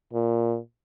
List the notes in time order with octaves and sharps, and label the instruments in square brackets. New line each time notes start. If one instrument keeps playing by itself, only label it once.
[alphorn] A#2